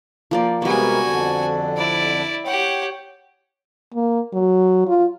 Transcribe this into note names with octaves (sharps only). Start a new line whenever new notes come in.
F3 A#3 D5
C3 G3 G#3 A#3 B3 F#4 G#5
F2 D3 D4
E4 D5
G4 C#5 F#5 G5
A#3
F#3
F4